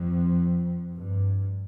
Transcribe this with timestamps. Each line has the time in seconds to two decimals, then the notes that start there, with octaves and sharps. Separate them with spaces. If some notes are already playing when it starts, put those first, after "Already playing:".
Already playing: F2
0.96 G2